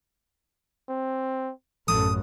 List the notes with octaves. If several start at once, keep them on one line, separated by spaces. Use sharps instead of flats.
C4
A1 F#2 A4 D#6